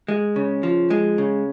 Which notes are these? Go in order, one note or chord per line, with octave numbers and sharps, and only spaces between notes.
G#3
C#3
F3
G#3
C#3